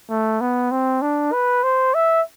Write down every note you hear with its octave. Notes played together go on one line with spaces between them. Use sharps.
A3
B3
C4
D4
B4
C5
E5